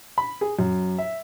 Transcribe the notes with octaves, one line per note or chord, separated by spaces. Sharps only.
B5
G#4
F#2
E5